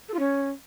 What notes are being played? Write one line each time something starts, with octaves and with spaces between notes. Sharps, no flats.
A4
F4
C#4